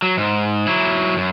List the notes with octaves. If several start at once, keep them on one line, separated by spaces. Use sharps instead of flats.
F#3
G#2
F#3 E4
F#2